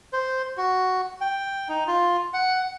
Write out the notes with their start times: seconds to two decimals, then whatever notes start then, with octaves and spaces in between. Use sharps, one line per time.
0.13 C5
0.57 F#4
1.21 G5
1.69 D#4
1.87 F4
2.34 F#5